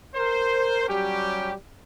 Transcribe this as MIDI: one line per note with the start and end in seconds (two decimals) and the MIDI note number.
0.15 0.85 70
0.15 0.85 72
0.89 1.52 54
0.89 1.52 55
0.89 1.52 61
0.89 1.52 67